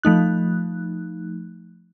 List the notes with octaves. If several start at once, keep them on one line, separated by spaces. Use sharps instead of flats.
F3 A3 D#4 F#6